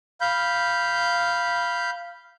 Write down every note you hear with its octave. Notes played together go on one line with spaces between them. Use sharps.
F5 B5 G6